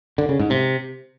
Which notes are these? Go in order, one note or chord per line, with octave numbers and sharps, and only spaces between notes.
D3
C#3
G#2
C3